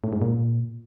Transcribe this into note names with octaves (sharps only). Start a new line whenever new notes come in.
A2
G#2
A#2